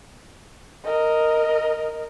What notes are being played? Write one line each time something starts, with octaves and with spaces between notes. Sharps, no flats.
A#4 D#5